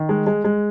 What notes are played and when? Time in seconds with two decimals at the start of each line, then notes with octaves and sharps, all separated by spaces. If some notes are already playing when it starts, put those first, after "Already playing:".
Already playing: D#3
0.09 G#3
0.27 G#3
0.44 G#3